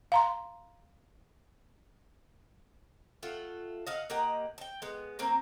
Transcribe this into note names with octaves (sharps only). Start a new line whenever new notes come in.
F5 A#5 C6
A3 F4 F#5 G5
D#5 F5 F#5
A#3 G4 D#5 F#5
G5 A5
G#3 B3
F#3 A#3 C4